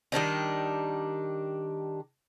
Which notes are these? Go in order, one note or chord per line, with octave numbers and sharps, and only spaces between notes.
D#3 G3 D4 D#4